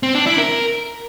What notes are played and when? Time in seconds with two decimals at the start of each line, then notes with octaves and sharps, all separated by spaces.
0.03 C4
0.15 D4
0.26 E4
0.38 A#4